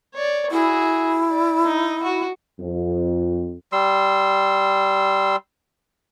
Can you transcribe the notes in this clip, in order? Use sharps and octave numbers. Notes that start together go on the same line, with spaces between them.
C#5 D5
E4 F#4 G#4
D5
D#4
F#4
F2
G3 C6 E6